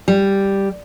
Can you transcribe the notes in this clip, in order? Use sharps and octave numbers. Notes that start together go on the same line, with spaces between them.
G3